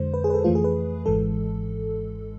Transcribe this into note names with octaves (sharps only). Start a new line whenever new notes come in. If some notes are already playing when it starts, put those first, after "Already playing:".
Already playing: F2 D3 G#3 C5
B4
G#4
B4
A4
F2 E3 A3 F4
G#4
B4
G#1 G#2 E3 G#3 A4